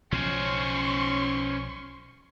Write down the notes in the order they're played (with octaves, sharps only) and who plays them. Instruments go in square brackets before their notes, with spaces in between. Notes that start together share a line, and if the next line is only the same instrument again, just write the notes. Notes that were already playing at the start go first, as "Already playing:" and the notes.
[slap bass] B1 C#3 F3 [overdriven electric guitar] C#4 C5 [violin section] C6 C#6